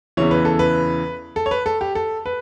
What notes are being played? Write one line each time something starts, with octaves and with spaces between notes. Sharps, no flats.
E2 C#3 E3 C#5
B4
A4
B4
A4
C#5
B4
A4
G4
A4
B4